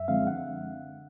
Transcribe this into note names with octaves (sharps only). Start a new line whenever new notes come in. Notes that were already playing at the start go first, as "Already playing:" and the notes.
Already playing: F#2 E5
D3 F3 G#3 C4 F5
D3 F#5